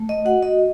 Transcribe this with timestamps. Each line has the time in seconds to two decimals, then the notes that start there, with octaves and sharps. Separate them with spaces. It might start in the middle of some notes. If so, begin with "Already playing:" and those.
Already playing: A3
0.09 D#5
0.25 F#4 F#5
0.43 D#5